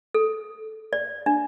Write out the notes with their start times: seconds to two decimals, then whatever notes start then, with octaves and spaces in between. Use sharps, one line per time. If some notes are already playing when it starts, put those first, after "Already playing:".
0.14 A4
0.93 D5
1.26 D4